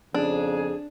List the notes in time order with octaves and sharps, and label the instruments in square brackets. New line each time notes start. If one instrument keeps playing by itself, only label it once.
[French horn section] F2 C#3 [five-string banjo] D4 [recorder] G#4